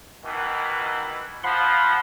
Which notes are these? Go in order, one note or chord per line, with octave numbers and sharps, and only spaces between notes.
B2 D#3 E3
F3 F#5 B5 C6